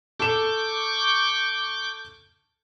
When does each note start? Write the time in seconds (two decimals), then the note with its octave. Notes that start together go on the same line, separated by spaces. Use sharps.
0.20 A4 C#6 D6 G6 E7